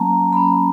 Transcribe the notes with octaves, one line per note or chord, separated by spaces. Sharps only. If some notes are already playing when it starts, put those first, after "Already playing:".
Already playing: F#3 A#3 C#4 A5 A#5
F#3 A#3 C#4 B5